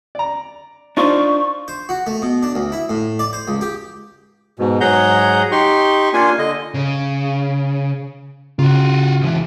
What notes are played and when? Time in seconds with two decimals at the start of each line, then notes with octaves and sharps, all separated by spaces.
0.15 D5 A#5
0.97 D4 D#4 F4 C5 C#6
1.68 C5
1.89 F#4
2.07 A3
2.22 B2
2.43 D4
2.55 D2
2.72 E4
2.89 A2
3.19 D5
3.33 C5
3.48 C#2
3.61 G4
4.59 G#2 B2
4.81 G#2 F#3 G#4 F#5 A#5 G6
5.52 D#4 G4 C6 C#6
6.13 A#3 D4 F4 G#5
6.38 D3 D#5
6.74 C#3
8.59 C#3 F4 F#4
9.21 C#2 E3